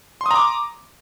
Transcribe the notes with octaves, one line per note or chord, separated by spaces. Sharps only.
A#5 C6 D6 D#6